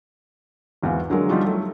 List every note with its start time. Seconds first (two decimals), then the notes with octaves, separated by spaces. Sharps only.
0.83 G#1 E2 E3 F5
1.10 D3 F#3 G#3 A#4
1.29 F3 G3 D#4 F4 F#4
1.43 F#3 A3